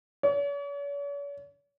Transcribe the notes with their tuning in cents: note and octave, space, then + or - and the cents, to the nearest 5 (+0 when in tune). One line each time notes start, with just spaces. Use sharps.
C#5 +45